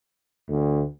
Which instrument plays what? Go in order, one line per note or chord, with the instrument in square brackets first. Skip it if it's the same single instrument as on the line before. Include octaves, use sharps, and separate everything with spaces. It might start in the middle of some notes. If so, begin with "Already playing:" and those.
[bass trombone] D2